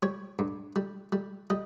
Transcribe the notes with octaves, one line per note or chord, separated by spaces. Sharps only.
G3 C#5
G2
G3
G3
G3 D#5